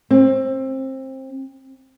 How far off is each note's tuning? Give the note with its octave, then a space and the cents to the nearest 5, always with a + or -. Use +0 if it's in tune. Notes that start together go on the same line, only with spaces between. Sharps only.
C4 +25